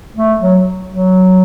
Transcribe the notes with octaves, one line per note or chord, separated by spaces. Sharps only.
A3
F#3
F#3